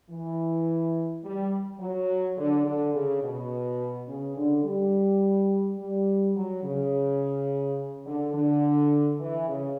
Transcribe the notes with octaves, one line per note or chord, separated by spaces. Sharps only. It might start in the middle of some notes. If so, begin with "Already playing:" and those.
E3
G3
F#3
D3
D3
C#3
B2
C#3
D3
G3
G3
F#3
C#3
D3
D3
E3
C#3